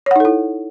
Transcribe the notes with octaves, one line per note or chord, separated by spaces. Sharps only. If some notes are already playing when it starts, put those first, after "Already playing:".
D#4 E4 A4 C#5 F#5